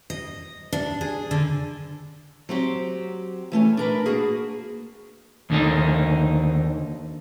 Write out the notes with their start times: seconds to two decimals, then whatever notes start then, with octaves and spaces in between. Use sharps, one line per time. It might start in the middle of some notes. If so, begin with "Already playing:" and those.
0.10 D#5
0.73 D4
1.01 G#4
1.31 D3
2.49 F#3 C4 G4
3.52 E3 A3 C#4 G#5
3.77 D4 A#4 B4
4.06 A#3 F#4 G#4
5.50 D#2 D3 D#4